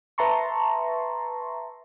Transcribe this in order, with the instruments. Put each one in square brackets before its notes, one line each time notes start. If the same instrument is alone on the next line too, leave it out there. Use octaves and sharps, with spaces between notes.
[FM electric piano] B4 E5 A5 A#5 C6 C#6